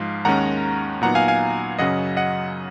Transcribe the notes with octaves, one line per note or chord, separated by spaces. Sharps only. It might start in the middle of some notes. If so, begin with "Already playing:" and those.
Already playing: G#2 F3 G#3 F5
D#2 D#3 G#3 C#4 F#5 A#5
A#2 F#3 B3 D#4 F#5 A#5
F5 G#5
F5 G#5
F#2 C#3 F#3 C#4 D#5 F#5
D#5 F#5